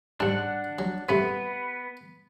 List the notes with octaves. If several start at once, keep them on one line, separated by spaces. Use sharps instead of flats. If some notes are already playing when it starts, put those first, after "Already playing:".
G#2 G3 D4 F#5
F#3
G2 C3 A3 B3 B4